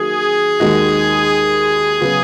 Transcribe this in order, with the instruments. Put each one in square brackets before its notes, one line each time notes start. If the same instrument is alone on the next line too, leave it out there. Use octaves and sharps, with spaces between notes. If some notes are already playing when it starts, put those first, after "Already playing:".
Already playing: [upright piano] D#3 F#3 A#3 [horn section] G#4
[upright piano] D#2 D#3 G#3 D#4 F#4
C#3 F#3 B3 F#4